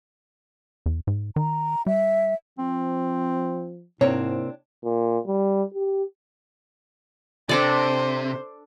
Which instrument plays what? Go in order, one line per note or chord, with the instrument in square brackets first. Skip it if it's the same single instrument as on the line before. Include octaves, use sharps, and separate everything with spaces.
[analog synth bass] E2
G#2
[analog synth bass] D#3 [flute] A#5
[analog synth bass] G3 [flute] E5
[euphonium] F3 [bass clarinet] C4
[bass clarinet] G#2 [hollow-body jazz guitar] C3 A#3 C4 [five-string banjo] D4 C#5 [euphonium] E4
[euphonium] A#2
G3
G4
[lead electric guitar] C3 [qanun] D4 A4 D5 [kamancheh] C5